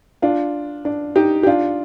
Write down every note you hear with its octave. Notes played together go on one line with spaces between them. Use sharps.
D4 F4
D4
D#4 G4
G4
D4 F4